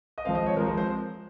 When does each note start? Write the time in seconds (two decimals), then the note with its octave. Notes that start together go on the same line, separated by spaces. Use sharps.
0.18 D#5
0.25 F3 G#3 C4 F5
0.35 D#5
0.46 C#5
0.56 F3 G#3 C4 A#4
0.67 C5
0.78 C5